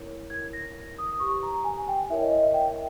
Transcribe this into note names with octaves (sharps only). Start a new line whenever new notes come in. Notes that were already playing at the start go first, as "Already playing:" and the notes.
Already playing: E4 A#4 C#5
E4 A#4 C#5 G#6
A#6
D#6
D#6
G4 B4 C#6
A#5
G#5
G5
E4 A#4 C#5 E5
D#5
D#5
E5
G5